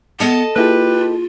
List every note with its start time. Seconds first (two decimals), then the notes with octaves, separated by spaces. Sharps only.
0.20 B3 A4 D#5 A5
0.56 A#3 E4 F4 G4 G#4 B4